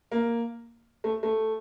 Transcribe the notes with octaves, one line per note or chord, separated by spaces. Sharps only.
A#3
A3
A3